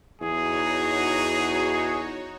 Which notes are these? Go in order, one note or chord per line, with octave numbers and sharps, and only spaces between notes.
E2 D#4 F#4 G#4 C#5